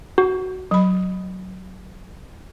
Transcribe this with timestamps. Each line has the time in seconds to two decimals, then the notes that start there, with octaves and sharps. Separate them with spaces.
0.18 F#4
0.71 F#3 B5